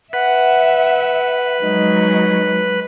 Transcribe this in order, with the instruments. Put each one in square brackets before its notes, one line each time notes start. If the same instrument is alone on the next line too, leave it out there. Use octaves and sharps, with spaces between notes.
[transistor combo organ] B4 [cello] E5 [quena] F#5
[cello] F#3 G#3 [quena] D#4